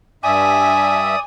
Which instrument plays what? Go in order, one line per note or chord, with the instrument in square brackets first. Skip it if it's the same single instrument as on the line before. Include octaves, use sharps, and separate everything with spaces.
[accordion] G2 E5 [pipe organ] D5 D#6 [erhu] G#5